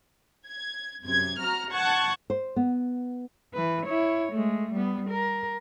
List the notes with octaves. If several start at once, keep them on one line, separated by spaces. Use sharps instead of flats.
G#6
F#2 C3 G#6
F#4 A#5 F6
F#5 A5 C#6 F#6 G#6
C5
B3
E3 B4
E4 C#5
G#3 A3
G3 B3
A#4